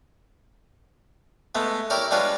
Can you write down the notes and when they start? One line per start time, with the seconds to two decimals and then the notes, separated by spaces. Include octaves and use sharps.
1.55 G#3 A3 B3
1.90 E4 G4 A#4 C#5 D5
2.11 G3 G#3 D4 F4 B4 C#5